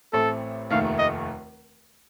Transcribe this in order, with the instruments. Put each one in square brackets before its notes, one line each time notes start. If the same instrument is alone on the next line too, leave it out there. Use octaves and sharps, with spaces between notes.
[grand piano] A1 A2 A3 C4 [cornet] A4
[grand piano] F1 D#2 D#3 A3 [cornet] F5
[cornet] D#5